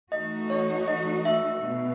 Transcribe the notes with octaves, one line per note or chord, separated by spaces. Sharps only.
E3 A3 D#4 F#4 D#5
C#5
D#5
E5
B2